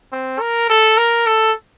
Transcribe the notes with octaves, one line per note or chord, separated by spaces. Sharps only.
C4
A#4
A4
A#4
A4